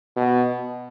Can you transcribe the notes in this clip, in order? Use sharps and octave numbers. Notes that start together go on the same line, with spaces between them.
B2